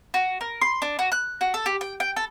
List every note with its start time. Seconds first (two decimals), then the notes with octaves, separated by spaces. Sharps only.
0.14 F#4
0.41 A#4
0.61 C6
0.82 D4
0.99 F#4
1.12 F#6
1.41 F#4
1.54 A4
1.66 G4
1.81 G5
2.00 G5
2.16 A4